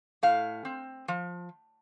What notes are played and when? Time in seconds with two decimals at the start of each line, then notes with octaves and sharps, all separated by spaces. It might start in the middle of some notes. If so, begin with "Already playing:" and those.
0.23 A2 F5
0.65 C4
1.08 F3